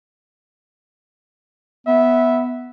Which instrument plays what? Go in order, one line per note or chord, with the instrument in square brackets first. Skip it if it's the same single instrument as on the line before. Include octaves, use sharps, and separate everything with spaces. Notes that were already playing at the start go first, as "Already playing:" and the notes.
[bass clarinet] B3 [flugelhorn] E5